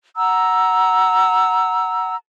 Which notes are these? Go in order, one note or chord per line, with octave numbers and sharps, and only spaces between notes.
F#5 A#5 E6